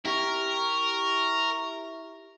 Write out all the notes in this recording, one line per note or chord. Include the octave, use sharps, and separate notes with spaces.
E4 G4 A#4 C#6